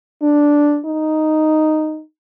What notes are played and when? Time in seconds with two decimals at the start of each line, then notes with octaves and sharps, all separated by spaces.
0.22 D4
0.86 D#4